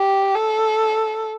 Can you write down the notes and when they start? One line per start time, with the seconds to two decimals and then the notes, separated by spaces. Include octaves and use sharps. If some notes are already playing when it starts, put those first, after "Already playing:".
Already playing: G4
0.36 A4